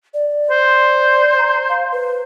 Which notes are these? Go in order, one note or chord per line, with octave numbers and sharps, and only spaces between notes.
D5
C5
A#5
F5
B4